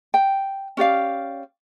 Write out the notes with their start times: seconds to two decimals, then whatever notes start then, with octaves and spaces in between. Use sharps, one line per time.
0.14 G5
0.77 C#4 G4 D5 F5